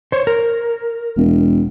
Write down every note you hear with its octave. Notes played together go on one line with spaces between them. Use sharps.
C5 C#5
A#4
E1